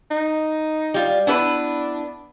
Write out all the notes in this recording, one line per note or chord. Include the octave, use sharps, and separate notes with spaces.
D#4
G3 F4
B3 D4 E4 B4